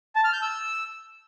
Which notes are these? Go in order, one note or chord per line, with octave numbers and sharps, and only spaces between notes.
A5
F6
G6
E6